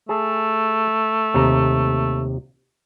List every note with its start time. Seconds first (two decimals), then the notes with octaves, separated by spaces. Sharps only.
0.09 A3 G#4 A5
1.34 D#2 C3 A#5